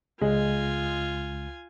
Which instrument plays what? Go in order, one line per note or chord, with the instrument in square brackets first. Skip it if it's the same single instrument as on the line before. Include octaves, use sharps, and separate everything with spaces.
[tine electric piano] C#2 [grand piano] G#3 [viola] F4 G#5